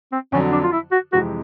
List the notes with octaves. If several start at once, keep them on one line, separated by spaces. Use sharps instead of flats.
C4
F2 D3 F#3 C#4
D4
F4
E4
F#4
F2 C3 E3 G#3 F#4